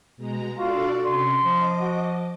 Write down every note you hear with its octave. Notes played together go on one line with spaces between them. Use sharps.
B2 G#3 A#5
D4 F4 F#4 A4 D5
C3 C#4 C6
F3 D#5 D6
F#4